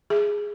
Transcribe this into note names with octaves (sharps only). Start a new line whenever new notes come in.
G#4